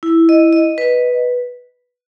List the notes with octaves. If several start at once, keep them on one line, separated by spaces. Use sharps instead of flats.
E4
D#5
D#5
B4